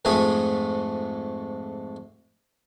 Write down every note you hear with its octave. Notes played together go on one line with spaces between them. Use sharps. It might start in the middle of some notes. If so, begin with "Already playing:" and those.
F2 G#2 G#3 A3 G#5 D#6